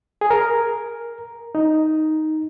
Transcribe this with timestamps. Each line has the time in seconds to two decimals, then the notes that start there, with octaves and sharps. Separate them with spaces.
0.21 G#4
0.31 A#4
1.55 D#4